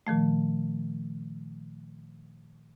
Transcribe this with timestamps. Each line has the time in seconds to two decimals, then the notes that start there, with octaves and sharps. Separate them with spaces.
0.07 A#2 D#3 F3 A3